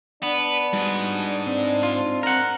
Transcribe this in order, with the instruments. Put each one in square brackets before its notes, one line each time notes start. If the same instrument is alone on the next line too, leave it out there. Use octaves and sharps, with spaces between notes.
[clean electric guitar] B3 [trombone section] D4 [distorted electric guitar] B4
[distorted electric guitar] G#2 G#3 [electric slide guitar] G3 F#4
[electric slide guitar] C4
[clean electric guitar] F4
A#4 F#5